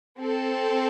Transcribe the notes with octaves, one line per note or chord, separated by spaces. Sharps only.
C4 A4